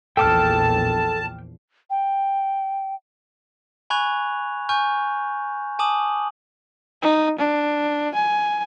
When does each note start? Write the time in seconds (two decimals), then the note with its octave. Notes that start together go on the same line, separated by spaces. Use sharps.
0.17 A#1 E2 F3 A4 G5 A5 D6 F6
1.90 G5
3.90 G#5 B5 C#6 F#6 G#6 F7
4.69 G#5 C#6 F6 G6
5.79 G#5 A5 D6 D#6 F#7
7.02 D#4
7.39 D4
8.15 G#5